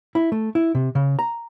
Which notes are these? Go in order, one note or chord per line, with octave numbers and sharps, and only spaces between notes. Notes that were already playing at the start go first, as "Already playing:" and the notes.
E4
A3
E4
C3
C#3
A#5